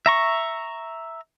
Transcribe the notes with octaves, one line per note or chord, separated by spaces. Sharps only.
E5 A#5 C#6